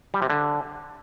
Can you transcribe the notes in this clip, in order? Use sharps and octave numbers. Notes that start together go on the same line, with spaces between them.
G3
C3
D3